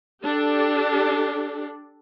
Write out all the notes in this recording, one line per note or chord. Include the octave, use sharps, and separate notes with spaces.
D4 G4 A4